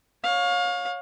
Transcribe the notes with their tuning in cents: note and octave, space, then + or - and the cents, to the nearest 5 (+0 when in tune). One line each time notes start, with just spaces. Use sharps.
C#5 +0 F5 +30